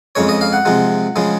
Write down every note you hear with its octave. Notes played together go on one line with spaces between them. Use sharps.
F2 C#3 G#3 C#5
D#5
F5
F#5
C3 F3 G#3
C#3 F3 G#3